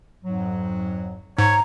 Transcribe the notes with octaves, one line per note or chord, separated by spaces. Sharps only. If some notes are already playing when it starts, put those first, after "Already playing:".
F2 G#2 F#3
G#2 C#5 A#5